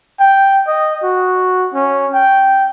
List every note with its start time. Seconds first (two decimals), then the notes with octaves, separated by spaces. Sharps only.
0.20 G5
0.67 D#5
1.03 F#4
1.74 C#4
2.14 G5